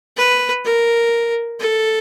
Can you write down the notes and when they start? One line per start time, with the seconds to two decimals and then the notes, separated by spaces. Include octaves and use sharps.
0.17 B4
0.65 A#4
1.60 A4